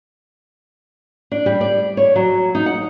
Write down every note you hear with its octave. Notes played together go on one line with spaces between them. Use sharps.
D4
G3
D5
C#5
F#3
D#4
F#5